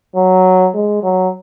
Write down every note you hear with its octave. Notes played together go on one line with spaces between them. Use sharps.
F#3
G#3
F#3